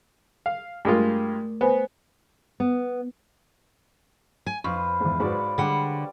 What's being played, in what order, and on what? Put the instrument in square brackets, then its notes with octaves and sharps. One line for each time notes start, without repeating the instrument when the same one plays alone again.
[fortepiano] F5
[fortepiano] G2 G#3 F4 [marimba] A3 A#4
[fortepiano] B3 [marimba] C5 G#5
[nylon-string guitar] B3
[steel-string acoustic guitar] G#5
[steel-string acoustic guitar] F2 [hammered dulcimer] B4 C5 F5 [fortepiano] C#6
[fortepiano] E2 G#2
[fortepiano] G#2 F#4 B4 [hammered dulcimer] C#5 D5 B5
[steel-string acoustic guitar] D3 F#5 [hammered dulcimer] G3 D6 [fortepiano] G#3